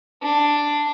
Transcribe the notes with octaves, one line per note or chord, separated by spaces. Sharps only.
D4